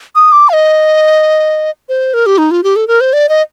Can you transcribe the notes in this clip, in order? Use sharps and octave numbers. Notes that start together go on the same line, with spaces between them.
D#6
D6
F5
D#5
C5
A#4
G4
D#4
F4
G4
A4
A#4
C5
D5
D#5